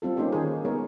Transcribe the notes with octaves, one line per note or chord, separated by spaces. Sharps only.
G3 C4 F4 A4
A#3 C#4 D#4 G4 C5
D#3 G#4
G#3 B3 G#4 A#4 C#5